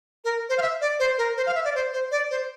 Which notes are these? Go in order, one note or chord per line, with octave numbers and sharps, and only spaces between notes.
A#4
C5
F5
E5
D5
C5
A#4
C5
F5
E5
D5
C5
C5
D5
C5